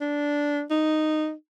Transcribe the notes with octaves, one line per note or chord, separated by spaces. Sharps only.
D4
D#4